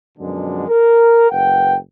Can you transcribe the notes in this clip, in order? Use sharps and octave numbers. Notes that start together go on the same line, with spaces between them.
F#2 B2 D3 F3 G#3 D4
A#4
F#1 B4 F#5 G5